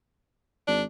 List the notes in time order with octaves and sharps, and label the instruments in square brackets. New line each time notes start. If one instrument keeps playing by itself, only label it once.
[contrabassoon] G#1 [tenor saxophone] D4